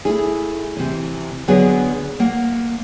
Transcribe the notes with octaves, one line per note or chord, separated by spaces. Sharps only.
A3 E4 G#4
C3 E3
D3 F#3 B3 D4 G#4
A#3 F#5